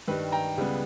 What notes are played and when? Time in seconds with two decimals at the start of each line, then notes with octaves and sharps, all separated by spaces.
0.08 G2 D#3 G3 B4
0.32 G5 A#5
0.57 C#2 C#3 G3 B3